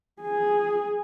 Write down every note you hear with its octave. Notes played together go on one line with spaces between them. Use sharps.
G#4